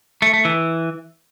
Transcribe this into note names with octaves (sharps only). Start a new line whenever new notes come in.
A3
A3
E3